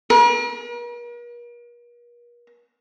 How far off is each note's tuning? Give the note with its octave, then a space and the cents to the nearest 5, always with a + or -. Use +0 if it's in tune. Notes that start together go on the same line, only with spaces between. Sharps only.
A#4 +45